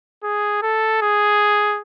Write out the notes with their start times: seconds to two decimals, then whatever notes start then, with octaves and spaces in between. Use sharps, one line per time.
0.24 G#4
0.62 A4
1.02 G#4